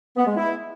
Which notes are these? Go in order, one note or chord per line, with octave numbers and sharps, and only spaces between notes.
B3
G#3
E4